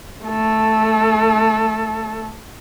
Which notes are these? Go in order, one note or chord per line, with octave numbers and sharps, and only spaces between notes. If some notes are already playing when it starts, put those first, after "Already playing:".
A3 A4